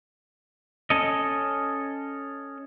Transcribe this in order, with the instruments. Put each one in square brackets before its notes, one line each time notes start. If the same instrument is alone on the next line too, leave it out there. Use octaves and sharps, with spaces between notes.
[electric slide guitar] C#4 A4 D#5